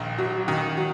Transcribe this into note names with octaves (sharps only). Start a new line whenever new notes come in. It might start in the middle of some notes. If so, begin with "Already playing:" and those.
Already playing: A#1 D#3
F#3
D#3
F#3